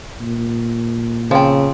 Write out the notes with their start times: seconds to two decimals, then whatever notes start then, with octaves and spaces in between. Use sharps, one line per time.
0.21 A#2
1.31 C#3 F3 C4